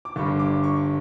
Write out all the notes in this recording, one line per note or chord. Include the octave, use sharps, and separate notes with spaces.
D6
G1 G2 D3 C#6
D6
C#6